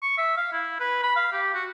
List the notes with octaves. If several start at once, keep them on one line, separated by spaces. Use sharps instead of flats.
C#6
E5
F5
E4
B4
B5
F5
G4
F#4